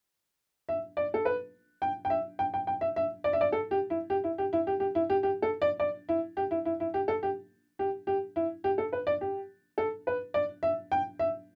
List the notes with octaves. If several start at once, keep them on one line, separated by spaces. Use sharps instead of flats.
E5
D5
A4
B4
G5
G5
E5
G5
G5
G5
E5
E5
D5
E5
D5
A4
G4
E4
G4
E4
G4
E4
G4
G4
E4
G4
G4
A4
D5
D5
E4
G4
E4
E4
E4
G4
A4
G4
G4
G4
E4
G4
A4
B4
D5
G4
A4
B4
D5
E5
G5
E5